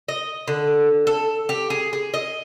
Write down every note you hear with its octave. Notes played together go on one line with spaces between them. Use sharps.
D#5
D3
A4
G4
G#4
G#4
D#5